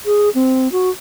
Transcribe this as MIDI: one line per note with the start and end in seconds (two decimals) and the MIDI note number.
0.05 0.29 68
0.34 0.71 60
0.72 0.90 66